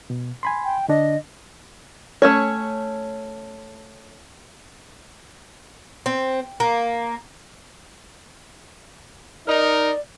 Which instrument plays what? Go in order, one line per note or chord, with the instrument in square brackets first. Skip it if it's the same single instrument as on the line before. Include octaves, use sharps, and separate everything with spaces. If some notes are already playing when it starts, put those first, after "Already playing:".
[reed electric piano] B2
G#5 B5 C6
[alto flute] G5
[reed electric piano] D3 D4 [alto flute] D#5
[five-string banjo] A3 C#4 C#5
[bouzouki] C4
A#3
[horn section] D#4 A#4 [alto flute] D5